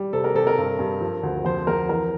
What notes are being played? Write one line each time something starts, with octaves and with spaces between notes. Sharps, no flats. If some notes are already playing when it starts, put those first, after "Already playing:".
Already playing: G3
C3 A4
A#4
C3 A4
A#4
G2
G2
F3
D2
F2 C5
F2 A#4
E3 A#4